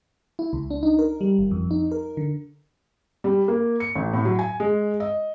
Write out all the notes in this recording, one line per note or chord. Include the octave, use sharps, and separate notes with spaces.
E4
C#2
D4
D#4
A#4
G3
G#1
F2
D#4
A#4
D3
G3
A#3
C#7
A1
A2
F#3
G#5
G#3
D#5